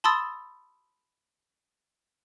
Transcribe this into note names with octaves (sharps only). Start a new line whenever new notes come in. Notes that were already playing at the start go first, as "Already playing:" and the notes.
A5 B5 C6 D#6 E6 A6